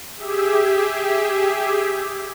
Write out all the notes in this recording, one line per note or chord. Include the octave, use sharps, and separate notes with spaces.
G4 G#4 E5